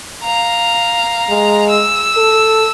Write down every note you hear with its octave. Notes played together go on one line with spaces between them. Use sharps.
F5 A#5
G#3
E6
A4